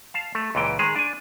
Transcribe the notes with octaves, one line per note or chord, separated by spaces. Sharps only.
F5 A5
A3
C#2 A#2 E3 G5
D#3 G#3 G#4
D4 G#5